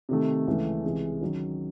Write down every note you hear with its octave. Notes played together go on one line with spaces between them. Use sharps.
C3 D#3 A3
C#2 C#3 E3 A3 C#4
C#2 C3 E3 G#3 C#4
D#3 F#3 C#4